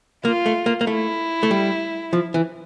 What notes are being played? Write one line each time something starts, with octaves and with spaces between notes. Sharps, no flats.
A#3 F4
A3
A#3
A#3
A3 E4
A3
G3
F3
E3